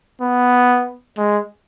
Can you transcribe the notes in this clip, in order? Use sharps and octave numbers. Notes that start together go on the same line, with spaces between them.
B3
G#3